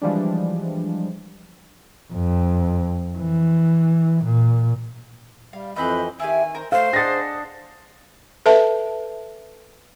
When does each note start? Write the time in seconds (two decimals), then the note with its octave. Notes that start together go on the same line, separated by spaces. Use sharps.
0.02 E3 F3 G3 G#3 D4
2.14 F2
3.18 E3
4.25 A#2
5.53 G3 F5
5.76 F2 E3 C4 D#5 B5 F#6 G6
6.20 D#3 E4 G4 G#5
6.55 A#4 C5
6.72 A3 A4 C5 F5
6.93 D4 G#4 D#5 F#5 A6 A#6
8.46 A4 B4 E5 A5